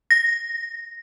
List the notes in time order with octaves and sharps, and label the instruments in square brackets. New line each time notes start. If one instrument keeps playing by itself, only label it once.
[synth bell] A#6